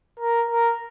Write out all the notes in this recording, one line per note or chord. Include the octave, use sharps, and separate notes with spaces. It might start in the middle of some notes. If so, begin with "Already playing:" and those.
A#4
A#4